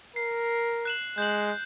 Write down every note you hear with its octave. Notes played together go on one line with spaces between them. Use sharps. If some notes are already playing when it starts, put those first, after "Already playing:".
A#4 C7
F#6 E7 F#7
G#3 G6 F#7